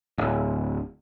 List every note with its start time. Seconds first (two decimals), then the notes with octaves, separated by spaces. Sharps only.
0.18 D1